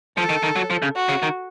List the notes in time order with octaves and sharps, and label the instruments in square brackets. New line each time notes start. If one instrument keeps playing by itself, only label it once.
[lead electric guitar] F3 [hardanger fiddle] A4
[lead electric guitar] D#3
D#3
F#3
F3
C#3
[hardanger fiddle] F#4
[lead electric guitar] C#3
D#3